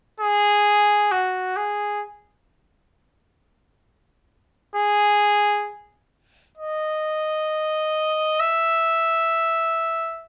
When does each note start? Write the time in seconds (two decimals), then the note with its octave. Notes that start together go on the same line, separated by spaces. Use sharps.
0.20 G#4
1.12 F#4
1.57 G#4
4.76 G#4
6.58 D#5
8.40 E5